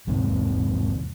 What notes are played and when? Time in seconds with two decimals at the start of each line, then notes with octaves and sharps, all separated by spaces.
0.07 E2 G#2 C3